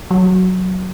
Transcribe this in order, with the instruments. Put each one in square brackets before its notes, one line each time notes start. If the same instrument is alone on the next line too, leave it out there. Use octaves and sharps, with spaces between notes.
[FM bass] F#3